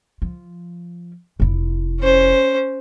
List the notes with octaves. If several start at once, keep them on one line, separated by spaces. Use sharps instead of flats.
F3
F1 E4
C#4 C5